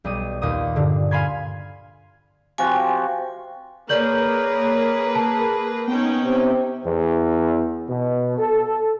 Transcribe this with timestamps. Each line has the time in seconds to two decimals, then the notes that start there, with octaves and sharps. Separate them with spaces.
0.04 B1 G3 D#6 D#7
0.42 D#2 A#2 D#6
0.76 G2 D3
1.11 F5 G#5 B5 C6 G#6
2.58 C3 F3 F#4 G#5
3.89 A#3 G#4 A#4 B4 C#5 D5 G6 F#7
5.15 A5
5.87 B3 C#4 D#4 G5
6.22 C3
6.85 E2
7.89 B2
8.38 A4